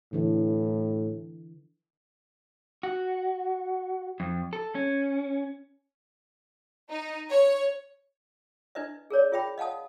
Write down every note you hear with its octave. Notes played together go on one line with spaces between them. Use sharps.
A2 D3 E3
F#4
F2
A4
C#4
D#4
C#5
D4 E4 B4 D#5 E5
G#4 A#4 C#5 D5
F4 G#4 E5 G5 B5
D#5 F5 F#5 A5 D#6